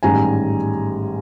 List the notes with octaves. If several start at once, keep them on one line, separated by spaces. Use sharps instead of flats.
A1 G#2 D#3 G3 G#5 A#5